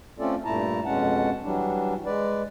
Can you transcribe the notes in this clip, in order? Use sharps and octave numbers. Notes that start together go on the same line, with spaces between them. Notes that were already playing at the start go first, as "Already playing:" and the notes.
A3 C4 C#4 F4 A4 D5
G2 A#2 A3 E4 A5 A#5
F2 B2 G#3 C#4 F#5 A5
E3 F#3 G3 D4
G#3 B4 D5